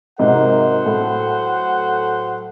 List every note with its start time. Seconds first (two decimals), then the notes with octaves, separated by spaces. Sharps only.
0.19 G#2 C3 F#3 A#4 C5 F#5
0.86 A2 A4